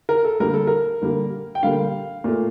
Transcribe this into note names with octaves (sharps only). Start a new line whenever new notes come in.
A#4
A4
D3 G3 A#3 A#4
A4
A#4
D3 G3 A#3
G5
D3 G3 A#3 F5
A#2 A3